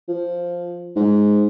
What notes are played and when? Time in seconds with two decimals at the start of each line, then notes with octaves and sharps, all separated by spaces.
0.08 F3
0.96 G#2